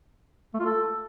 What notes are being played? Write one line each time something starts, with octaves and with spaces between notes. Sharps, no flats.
A3
F4
A4